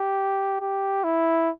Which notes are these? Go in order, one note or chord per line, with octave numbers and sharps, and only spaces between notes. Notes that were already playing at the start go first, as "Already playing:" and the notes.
Already playing: G4
G4
E4